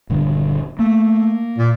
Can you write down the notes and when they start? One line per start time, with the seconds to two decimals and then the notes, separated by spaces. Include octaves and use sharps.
0.10 D#1 G2 D3
0.79 A3 A#3
1.58 A#2